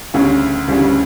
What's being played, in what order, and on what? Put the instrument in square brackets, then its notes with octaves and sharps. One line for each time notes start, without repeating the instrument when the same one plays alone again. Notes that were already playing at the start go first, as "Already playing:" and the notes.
[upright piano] D2 C#3 G3 C#4
D2 C#3 G3 C#4